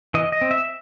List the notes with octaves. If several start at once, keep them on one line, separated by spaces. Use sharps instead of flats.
E3 D#5
D#5
C4
E5